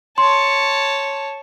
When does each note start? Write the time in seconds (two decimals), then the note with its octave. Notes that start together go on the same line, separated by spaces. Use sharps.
0.18 C#5 A5 C6